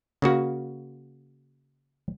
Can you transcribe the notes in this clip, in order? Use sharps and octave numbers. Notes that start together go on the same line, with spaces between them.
C#3 A#3 F#4